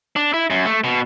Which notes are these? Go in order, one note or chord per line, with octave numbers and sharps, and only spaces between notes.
D4
E4
F#2
A3
B2